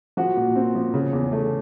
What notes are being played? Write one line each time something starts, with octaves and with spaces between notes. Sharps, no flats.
F3 F#4
A#2
C4
F3
C#3
E2
A3